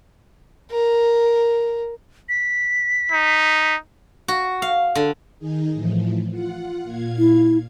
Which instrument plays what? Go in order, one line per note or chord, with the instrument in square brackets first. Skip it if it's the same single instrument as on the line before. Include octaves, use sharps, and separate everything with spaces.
[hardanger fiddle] A#4
[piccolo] B6
[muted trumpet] D#4
[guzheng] F#4
F5
D3
[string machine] D#3 D#4 G#4
A2 E3 F3
F4 F#5
A#2 F5 G#6
[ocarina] E4